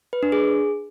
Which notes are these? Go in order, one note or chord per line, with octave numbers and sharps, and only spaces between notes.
B4
D4
G#4